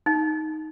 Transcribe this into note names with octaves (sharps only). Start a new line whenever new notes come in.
D#4